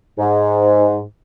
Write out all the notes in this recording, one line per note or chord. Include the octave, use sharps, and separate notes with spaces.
G#2